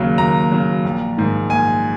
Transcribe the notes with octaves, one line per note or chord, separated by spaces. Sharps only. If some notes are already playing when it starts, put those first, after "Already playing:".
Already playing: D#2 C#3 F#3
D#2 A#5
C#3 F#3
A#1
G#2 D#3
A#1 G#5